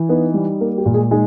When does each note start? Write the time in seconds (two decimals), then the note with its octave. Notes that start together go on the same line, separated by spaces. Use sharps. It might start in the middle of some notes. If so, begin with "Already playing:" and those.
Already playing: E3
0.09 B3 D#4 B4
0.34 G3
0.61 A#3 A#4
0.78 G4
0.86 A#2
0.94 G#3 G#4
1.11 G#3 D#4 G#4